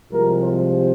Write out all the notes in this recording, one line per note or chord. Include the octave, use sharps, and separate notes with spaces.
C2 C3 F3 G#3 A#4
C5